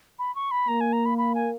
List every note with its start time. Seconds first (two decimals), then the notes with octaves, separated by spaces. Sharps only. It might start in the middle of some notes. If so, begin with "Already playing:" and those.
0.19 B5
0.35 C#6
0.51 B5
0.68 A#3 A#5
0.81 G#5
0.93 A#5
1.06 B5
1.18 B5
1.35 G#5